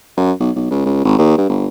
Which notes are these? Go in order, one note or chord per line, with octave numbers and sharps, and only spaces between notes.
F#2
B1
B1
C#2
C#2
G#1
D#2
G2
G1